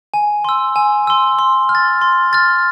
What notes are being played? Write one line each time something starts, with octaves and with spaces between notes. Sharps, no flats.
G#5
C6 E6
G#5
C6 E6
C6
F6
A6
C6
F6 A6